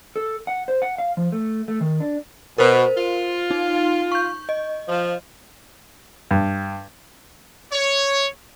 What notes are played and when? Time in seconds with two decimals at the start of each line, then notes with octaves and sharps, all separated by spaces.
0.16 A4
0.47 F#5
0.68 C5
0.82 F#5
0.98 F5
1.17 F3
1.32 A3
1.68 A3
1.81 D#3
2.00 D4
2.58 B2 A#4 C5
2.97 F4
3.51 D#4
4.12 C#6 G6
4.49 D#5
4.88 F3
6.31 G2
7.72 C#5